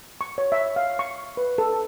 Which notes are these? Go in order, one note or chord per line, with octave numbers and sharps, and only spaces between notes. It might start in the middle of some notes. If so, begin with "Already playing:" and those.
C#6
C#5
E5
F5
C#6
B4
A4